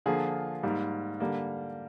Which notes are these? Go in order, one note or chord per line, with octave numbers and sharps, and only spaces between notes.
D3 F3 A#3 F4 G#4
G#2 G3 A#3
D3 G3 A#3